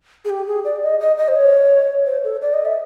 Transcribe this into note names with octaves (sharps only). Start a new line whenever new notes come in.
G#4
G4
G#4
D5
D#5
D#5
D#5
C5
C#5
C5
A4
D5
D#5
E5